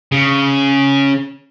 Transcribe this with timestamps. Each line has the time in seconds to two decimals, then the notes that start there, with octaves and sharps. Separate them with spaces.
0.12 C#3